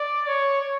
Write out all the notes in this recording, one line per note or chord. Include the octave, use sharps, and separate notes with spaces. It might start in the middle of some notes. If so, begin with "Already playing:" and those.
Already playing: D5
C#5